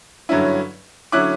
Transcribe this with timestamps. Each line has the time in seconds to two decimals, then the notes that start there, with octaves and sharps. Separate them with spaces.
0.29 G2 D3 F#3 C#4 E4
1.12 D3 F#3 C#4 E4 D6 F#6